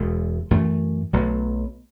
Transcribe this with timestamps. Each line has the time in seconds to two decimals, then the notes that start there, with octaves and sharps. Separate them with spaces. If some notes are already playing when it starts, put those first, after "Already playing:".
Already playing: E1 E2 B2 G#3
0.51 F#2 E3 A3
1.13 B1 B2 F#3 A3